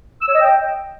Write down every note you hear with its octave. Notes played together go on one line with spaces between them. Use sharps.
E6
C#5
D#5
G5